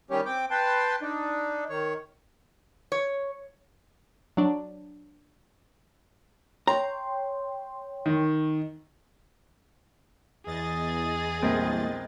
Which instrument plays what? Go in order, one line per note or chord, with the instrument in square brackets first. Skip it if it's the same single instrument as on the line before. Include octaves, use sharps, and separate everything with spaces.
[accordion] D#3 G3 C#4 G4 C#5
C4 G5 D6
B4 G5 A5 C6
D4 D#4
D#3 C#5
[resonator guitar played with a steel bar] C#5
[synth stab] F#3 D4
[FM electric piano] C#5 G5 C6 [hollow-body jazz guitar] A#5
[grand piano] D#3
[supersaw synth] E2 D#5 A6 [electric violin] G#4
[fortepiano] A#1 G#3 C4 [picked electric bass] G3 A#3